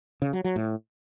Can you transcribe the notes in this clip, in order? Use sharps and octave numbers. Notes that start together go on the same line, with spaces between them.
C#3
F#3
F#3
A2